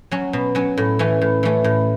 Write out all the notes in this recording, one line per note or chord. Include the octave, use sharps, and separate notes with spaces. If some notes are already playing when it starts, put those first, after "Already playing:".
F#3 C#4
B2
F#3 C#4
A2
E3 A3 C#4
A2
E3 A3 C#4
A2